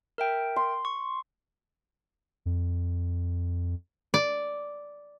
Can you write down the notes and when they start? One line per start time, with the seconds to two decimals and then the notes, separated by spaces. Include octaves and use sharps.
0.18 A#4 E5 G5
0.56 C6
0.85 C#6
2.46 F2
4.14 D5